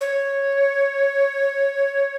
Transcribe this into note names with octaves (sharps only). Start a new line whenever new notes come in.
C#5